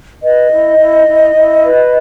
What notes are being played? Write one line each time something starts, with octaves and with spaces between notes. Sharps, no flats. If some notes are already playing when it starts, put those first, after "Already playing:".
B4 D#5
E4
E4
E4
E4
B4